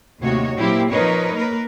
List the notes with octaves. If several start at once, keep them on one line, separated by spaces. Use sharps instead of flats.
D#2 A2 C3 F#4 C#5 D#5
A#2 F#3 A#3 C4 E4 G4
F3 D#4 A#4 B4 C#5
A#3 A#4 B4